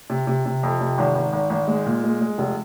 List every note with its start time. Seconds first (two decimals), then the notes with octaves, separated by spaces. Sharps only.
0.10 C3
0.27 C3
0.46 C3
0.63 F2
0.81 C3
0.98 G#1
1.16 G#1
1.33 G#1
1.50 G#1
1.67 G#3
1.86 A#2
2.04 G#3
2.21 G#3
2.38 F1